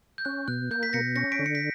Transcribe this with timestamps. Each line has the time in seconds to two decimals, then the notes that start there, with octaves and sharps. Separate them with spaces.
0.18 G6
0.25 C#4 F#6
0.48 B2 F#6
0.71 A#3 G6
0.82 G6 B6
0.93 B2 A#6 C#7
1.16 C#4 A#6 C#7
1.32 B6 D7
1.39 D3
1.46 C#7
1.55 B6